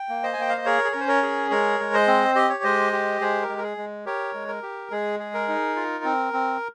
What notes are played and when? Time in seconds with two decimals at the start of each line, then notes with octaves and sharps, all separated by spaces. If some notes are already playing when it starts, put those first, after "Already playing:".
Already playing: G5
0.09 A#3
0.23 C5 D#5
0.33 G#5
0.38 A#3 G5
0.49 F5
0.57 D#5
0.65 G#4 A#4 C#5
0.84 G#4
0.92 C#4 A#4
1.00 C5
1.08 A#4 C#5
1.23 G#4
1.50 G#3 A#4 C#5
1.80 G#3
1.94 C5 D#5
2.07 C4
2.35 G4 D#5
2.50 C#5
2.64 G#3 C5 D#5
2.93 G4
3.21 G#3 G#4 C5
3.42 A#4
3.49 G#3
3.58 A#4
3.63 G#4
3.77 G#3
4.06 G4 A#4 C#5
4.34 G#3
4.48 A#4
4.63 G4
4.91 G#3 G#4
5.19 G#4
5.34 A#4
5.48 D#4
5.76 F4
6.04 C4
6.33 C4